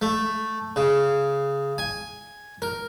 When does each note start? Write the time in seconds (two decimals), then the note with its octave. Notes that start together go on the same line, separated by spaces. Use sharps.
0.02 A3
0.76 C#3
1.78 G#5
2.62 A#4